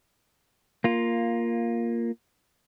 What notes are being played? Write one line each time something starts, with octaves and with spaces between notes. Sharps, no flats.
A#3 F4